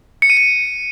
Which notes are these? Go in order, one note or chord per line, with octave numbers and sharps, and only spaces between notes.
C#7
D#7
C#7